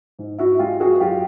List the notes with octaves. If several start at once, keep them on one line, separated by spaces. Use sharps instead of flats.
G#2
E4 F#4
G#3 F4 G4
F#4 G#4
F#2 F4 G4